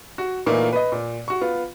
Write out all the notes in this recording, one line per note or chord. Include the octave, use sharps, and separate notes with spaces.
F#4
A#2 E3 A3 A#3 D#4 F4
B4 D#5
A#2
F#4 C#6
B3 F4